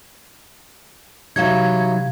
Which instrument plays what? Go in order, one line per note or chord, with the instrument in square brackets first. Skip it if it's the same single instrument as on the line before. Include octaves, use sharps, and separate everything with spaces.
[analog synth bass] C3 [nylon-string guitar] E3 F#3 D#4 [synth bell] F5 G#6